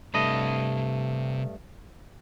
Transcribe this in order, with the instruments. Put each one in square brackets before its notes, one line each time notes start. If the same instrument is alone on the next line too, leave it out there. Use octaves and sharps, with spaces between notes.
[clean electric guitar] G2 A3 D#5 [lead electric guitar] C3 B5